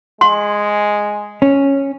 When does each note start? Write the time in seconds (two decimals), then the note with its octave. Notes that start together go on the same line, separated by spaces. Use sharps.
0.21 G#3 C6
1.42 C#4